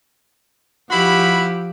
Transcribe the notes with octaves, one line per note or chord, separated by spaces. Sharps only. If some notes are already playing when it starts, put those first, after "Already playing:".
F3 E4 F#4 G4 B5